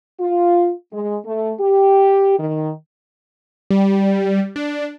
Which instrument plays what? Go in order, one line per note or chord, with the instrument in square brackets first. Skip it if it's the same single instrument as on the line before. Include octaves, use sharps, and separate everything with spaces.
[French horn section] F4
G#3
A3
G4
D#3
[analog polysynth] G3
D4